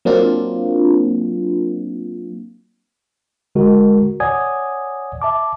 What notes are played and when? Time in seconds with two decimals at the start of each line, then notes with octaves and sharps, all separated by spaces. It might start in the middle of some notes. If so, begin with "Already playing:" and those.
0.05 F#3 A#3 C4 D4 F4
3.55 D3 G#3 F#4 A#4
4.20 C#5 D5 F#5 G#5 D#6 G#6
5.22 E5 A5 D6